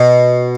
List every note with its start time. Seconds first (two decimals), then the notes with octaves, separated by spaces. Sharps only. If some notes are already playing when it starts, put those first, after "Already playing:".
Already playing: B2